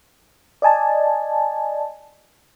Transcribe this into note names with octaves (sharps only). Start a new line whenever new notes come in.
D5 D#5 G#5 A5